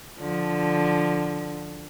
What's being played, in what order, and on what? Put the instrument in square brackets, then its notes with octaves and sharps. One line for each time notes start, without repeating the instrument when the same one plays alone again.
[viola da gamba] D3 F3